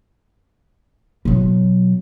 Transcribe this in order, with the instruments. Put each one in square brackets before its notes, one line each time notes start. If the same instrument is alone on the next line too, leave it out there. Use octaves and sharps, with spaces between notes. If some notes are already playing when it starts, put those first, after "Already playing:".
[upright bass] B2 F#3